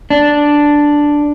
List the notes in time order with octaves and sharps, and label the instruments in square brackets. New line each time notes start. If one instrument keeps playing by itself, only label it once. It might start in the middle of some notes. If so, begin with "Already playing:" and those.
[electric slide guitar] D4